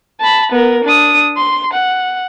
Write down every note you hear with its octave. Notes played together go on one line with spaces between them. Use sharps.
A5 B5
B3 A#4
D4 D#6
C6
F#5